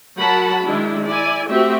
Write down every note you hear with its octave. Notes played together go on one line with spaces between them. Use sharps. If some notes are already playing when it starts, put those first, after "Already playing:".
F#3 A#4 F#5 A5 B5
D#3 G#3 D4 E4
E4 D5 G#5
A3 C4 F#4 G4 E5